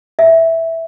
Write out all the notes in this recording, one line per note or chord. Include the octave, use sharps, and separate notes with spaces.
E5